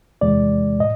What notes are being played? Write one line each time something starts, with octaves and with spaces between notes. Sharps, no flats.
E2 C3 E3 G#3 D5
A2 D#5